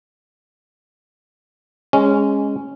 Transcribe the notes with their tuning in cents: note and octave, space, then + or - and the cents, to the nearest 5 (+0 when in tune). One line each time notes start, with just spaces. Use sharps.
G#3 -10 C#4 +0